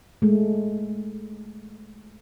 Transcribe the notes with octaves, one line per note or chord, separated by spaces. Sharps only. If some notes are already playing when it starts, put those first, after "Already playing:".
G#3 A3